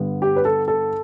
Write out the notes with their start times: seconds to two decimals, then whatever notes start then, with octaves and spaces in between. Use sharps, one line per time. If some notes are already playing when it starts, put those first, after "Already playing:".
Already playing: G2 D3 G3 B3
0.22 G4
0.36 B4
0.45 A4
0.68 A4